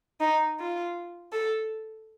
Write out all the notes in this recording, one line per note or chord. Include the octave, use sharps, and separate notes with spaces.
D#4
F4
A4